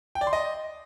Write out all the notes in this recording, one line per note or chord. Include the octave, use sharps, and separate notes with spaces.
G5
D5
C6
D#5